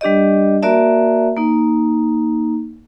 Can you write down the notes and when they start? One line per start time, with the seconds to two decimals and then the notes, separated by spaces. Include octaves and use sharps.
0.01 G3 D4 G4 D5 D#5
0.62 A#3 F#4 A#4 D5 E5 A5
1.36 A#3 D#4